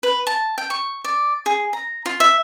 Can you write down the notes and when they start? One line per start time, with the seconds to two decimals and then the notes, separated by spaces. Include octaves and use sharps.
0.03 B4
0.27 A5
0.58 G5
0.70 C#6
1.04 D5
1.46 G#4
1.73 A#5
2.06 F4
2.20 E5